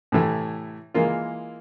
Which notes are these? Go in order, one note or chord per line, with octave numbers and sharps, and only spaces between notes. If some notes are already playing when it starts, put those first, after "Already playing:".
A2 C3 E3 A3
E3 G#3 A#3 F4